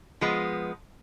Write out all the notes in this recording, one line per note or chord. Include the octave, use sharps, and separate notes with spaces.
F3 G#3 B3